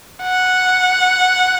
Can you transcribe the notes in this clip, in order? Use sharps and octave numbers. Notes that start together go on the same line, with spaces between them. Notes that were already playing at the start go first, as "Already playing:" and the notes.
F#5